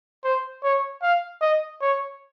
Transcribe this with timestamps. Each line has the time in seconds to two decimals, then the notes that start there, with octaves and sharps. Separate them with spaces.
0.24 C5
0.63 C#5
1.02 F5
1.41 D#5
1.81 C#5